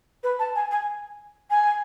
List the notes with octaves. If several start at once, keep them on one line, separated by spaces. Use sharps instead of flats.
B4
A5
G#5
G#5
G#5